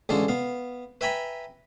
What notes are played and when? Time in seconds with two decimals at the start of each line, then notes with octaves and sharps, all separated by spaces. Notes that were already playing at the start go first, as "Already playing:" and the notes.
0.09 A1 D3 G#3 A4 F5
0.28 B3 F5
1.01 B4 E5 G5 G#5 A#5 B5